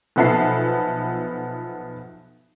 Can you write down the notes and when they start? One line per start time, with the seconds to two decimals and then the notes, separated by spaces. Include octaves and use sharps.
0.16 B1 F3 B3 A4 E5 C7